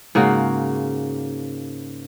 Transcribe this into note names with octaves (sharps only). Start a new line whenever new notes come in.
G#2 C#3 A#3 F#4